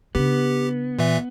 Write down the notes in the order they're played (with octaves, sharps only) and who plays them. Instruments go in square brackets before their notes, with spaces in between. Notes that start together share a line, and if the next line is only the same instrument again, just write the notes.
[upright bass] C#3 D4 [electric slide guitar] B3 [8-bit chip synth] G4
[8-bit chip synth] A#2 E3 E5